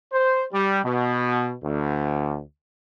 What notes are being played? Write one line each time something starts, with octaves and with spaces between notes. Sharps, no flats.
C5
G3
B2
D2